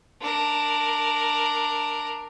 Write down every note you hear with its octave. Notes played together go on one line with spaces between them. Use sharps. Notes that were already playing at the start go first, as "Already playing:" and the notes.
D4 A#4